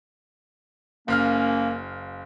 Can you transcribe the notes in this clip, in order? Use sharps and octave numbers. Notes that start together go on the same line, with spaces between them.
F#1 A#3 C#4 F5 F6